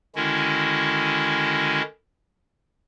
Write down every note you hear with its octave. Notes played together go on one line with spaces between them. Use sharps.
D3 D#3 G#3 C#4 E4 F#4